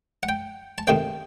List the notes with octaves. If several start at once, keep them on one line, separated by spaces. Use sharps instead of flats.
F#5
G5
A5
C3 D#3 A3 C4 G5